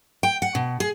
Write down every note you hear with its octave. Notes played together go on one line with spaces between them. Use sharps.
G5
F#5
B2
G#4